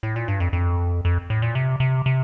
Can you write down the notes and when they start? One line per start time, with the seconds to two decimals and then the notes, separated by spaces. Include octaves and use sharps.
0.03 A2
0.16 A#2
0.28 G2
0.40 F2
0.53 F2
1.05 F2
1.30 A2
1.42 A#2
1.55 C3
1.80 C3
2.06 C3